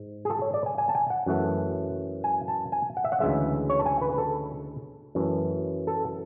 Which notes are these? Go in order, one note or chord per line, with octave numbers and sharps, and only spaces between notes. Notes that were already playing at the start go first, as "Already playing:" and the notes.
Already playing: G#2
G#4
A4
C#5
D5
G#5
G#5
A5
G#5
F#5
F#2 E3 A3
G#5
A5
G#5
F#5
E5
F#5
D2 C#3 E3 G#3 E5
C#5
A5
G#5
B4
B4
A4
F#2 E3 A3
A4